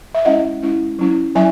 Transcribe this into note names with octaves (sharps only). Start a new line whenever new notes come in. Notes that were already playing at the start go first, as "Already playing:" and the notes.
E5
G#3 C#4 E4 D#5 F#5
G#3 C#4 E4
F#3 C#4 E4
F#3 C#4 E4 E5 G#5